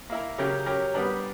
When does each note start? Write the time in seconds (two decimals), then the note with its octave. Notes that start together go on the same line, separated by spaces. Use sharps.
0.10 A#3 E4 A#4
0.38 C#3 F#3 C#4 G4 A#4
0.66 F#3 C#4 G4 A#4
0.94 G3 B3 D4 A#4